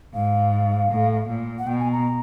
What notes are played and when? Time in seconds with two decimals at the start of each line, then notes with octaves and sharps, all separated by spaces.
0.14 G#2 F5
0.91 A2
1.29 A#2
1.59 F#5
1.67 B2 G5
1.79 G#5
1.92 A#5